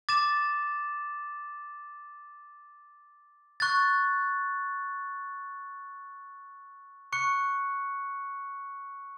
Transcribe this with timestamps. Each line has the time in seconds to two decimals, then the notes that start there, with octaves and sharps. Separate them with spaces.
0.09 D6 A6 E7
3.60 C#6 F#6 A6
7.13 C#6 F#6 C#7